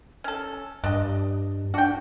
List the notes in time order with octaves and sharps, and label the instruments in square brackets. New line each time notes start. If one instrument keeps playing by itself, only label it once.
[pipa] C#4 A4
[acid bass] G2 [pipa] D4 D#5
[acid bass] D4 [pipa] F#4 G5